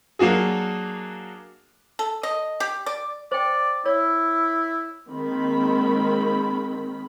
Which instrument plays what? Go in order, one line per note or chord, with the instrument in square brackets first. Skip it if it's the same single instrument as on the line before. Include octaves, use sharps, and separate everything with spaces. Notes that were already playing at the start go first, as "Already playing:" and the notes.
[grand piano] F#3 A#3 D4 F#4 G#4
[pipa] A4
D#5
G4
D5
[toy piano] C5 G5 [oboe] D5
[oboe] E4 [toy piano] C#5
[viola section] D#3 G#3 A#3 C4 B5